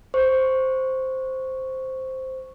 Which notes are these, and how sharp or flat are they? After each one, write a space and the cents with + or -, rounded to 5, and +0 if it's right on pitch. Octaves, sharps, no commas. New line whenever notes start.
C5 +0 C#6 +0